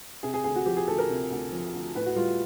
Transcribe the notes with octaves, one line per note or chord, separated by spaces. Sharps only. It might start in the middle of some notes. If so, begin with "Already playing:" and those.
C3 G#4
G#4
D2 G#4
F#4
F3 G4
G#4
D2 A4
A#4
C3
D2
F3
D2
A2 B4
F#4
G3 F4